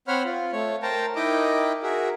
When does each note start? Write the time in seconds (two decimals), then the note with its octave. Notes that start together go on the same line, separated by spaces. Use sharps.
0.08 C4 C5 C#5 F#5 B5 F6
0.25 F4
0.52 A3 C#5
0.83 A#4 C5 G5 A5 A#5
1.16 D#4 E4 A#4 D#5 G5 D6
1.83 F#4 G#4 A#4 E5